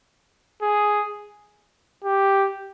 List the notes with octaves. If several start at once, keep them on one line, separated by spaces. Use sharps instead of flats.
G#4
G4